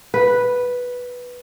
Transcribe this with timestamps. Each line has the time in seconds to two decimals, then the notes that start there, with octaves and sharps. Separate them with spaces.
0.14 B4